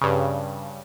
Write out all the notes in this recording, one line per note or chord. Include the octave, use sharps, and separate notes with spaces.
G2 C#3